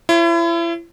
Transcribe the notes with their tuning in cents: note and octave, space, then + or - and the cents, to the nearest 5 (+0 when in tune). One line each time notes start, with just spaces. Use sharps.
E4 +35 C#5 -30